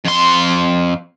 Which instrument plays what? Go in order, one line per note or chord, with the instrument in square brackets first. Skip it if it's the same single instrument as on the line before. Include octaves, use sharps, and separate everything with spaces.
[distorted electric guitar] F2 C6